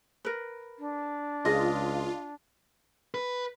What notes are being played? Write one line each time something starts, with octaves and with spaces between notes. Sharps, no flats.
A#4 B4
D4
C#2 F4 G#4 D#5
B4